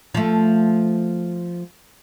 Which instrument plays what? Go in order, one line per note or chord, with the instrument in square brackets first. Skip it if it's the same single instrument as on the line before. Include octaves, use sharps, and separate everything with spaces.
[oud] F3 A3